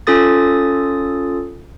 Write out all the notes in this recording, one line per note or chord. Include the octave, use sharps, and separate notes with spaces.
C#4 F4 A4 D#6 A6